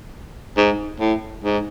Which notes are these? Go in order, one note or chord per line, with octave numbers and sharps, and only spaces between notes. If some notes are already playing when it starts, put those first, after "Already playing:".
G#2
A2
G#2